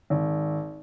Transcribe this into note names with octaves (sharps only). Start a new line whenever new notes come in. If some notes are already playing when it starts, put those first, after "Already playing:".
G#1